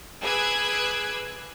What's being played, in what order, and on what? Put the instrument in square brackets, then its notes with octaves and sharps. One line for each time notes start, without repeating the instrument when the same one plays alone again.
[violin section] G#4 B4 D6 E6 F#6 G#6